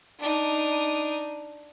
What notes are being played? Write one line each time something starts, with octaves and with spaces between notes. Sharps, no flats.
D4 D#4